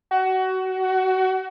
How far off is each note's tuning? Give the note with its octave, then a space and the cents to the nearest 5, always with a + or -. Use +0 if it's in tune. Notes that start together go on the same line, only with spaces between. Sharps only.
F#4 +25